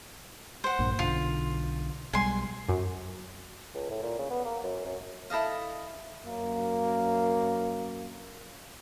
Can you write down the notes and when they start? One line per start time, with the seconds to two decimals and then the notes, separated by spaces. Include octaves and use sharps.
0.64 C5 F#5
0.79 A#1 G2 A#3
0.99 B1 D3 F4
2.13 B1 G3 G#3 G#5 C6
2.69 F#2
3.75 C#2
3.90 A2
4.03 A#2
4.19 C#3
4.30 B3
4.45 A#3
4.63 F#2
4.86 F#2
5.30 E4 A4 D#5 F5
6.25 F#2 A#3